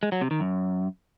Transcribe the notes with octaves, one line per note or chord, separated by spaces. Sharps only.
G#3
F#3
C3
D#3
F#2